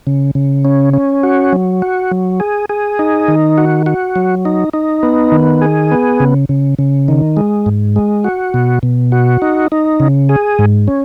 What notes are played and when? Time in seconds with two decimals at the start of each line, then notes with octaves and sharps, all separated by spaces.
0.07 C#3
0.35 C#3
0.65 C#4
0.94 C#4
1.23 F#4
1.53 F#3
1.82 F#4
2.11 F#3
2.40 G#4
2.69 G#4
2.99 D#4
3.28 D#3
3.58 F#4
3.86 F#4
4.16 F#3
4.45 D#4
4.73 D#4
5.03 B3
5.32 D#3
5.62 G#4
5.91 B3
6.20 C#3
6.49 C#3
6.79 C#3
7.08 D#3
7.37 G#3
7.66 G#2
7.96 G#3
8.24 F#4
8.54 B2
8.83 B2
9.12 F#4
9.42 D#4
9.72 D#4
10.00 C#3
10.29 G#4
10.59 G#2
10.88 C#4